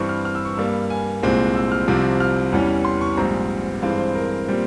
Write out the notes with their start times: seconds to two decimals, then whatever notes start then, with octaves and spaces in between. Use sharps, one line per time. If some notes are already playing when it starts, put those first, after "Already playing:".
Already playing: G2 E3 G3 C4 C#6
0.09 F6
0.25 F6
0.35 E6
0.45 C#6
0.54 G2 G3 A#3 E6
0.90 G#5
1.23 C2 A#2 G#3 C4
1.55 E6
1.72 F6
1.88 C2 C3 F3 C4
2.20 F6
2.52 E2 E3 G3 C#4
2.85 C6
3.01 C#6
3.17 A#1 G#2 G3 C4 A#5
3.82 G2 E3 G#3 C4 F5
3.98 C5
4.15 A#4
4.48 A#2 G3 C4